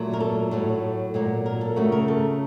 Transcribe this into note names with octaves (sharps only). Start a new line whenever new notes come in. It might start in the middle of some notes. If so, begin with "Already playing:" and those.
Already playing: A#2 F#3 A3
A#4
A4
A2 F#3 A3
A#2 F#3 A#3
A#4
A4
C#3 A3 F#4
A#4
A4